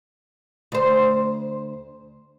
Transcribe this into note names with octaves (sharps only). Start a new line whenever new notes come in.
D2 C5